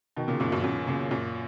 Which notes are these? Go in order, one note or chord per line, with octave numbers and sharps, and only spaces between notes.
B2 D#3
A#2 C#3
F#2 A#2
F#2
F#2 A#2
A#2 C#3
F#2 A#2